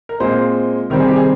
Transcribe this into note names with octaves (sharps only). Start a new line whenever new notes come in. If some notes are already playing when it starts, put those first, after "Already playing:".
A#4
A#2 G#3 C4 C5
C3 D#3 G3 C4 A#4
G#4
G4
G#4